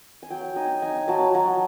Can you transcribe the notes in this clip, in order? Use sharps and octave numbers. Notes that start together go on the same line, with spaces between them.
G#5
F#3 G5
D#4 G#5
D#4 G#5
F#3 A5
F#3